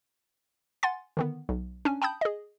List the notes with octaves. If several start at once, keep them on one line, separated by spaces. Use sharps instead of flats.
F#5 G#5 C6 A6
D3 D#3 B3
B1
C#4 D4 G#5
G5 A5 B5 D#6 G6
G#4 D#5